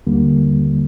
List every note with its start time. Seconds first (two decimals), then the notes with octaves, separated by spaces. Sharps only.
0.07 D#2 D3 G3 A#3